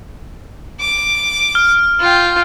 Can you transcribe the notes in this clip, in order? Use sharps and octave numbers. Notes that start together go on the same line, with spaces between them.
D6
F6
F4 G5